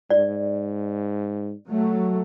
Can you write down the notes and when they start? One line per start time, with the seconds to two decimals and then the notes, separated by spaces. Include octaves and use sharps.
0.10 G#2 D5
1.68 F#3 A3